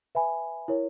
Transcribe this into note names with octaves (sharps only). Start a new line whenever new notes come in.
B4 E5 G#5 B5
E4 A#4 C#5